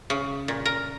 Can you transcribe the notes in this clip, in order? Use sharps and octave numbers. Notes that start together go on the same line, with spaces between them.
C#3
A#2
A#4